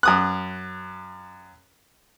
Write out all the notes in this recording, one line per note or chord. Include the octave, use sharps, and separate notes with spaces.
F#2 D#6 F#6